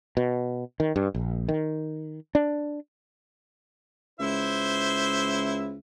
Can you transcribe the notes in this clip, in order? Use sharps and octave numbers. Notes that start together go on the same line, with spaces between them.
B2
D#3
G2
A#1
D#3
D4
C#2 E4 C5 E5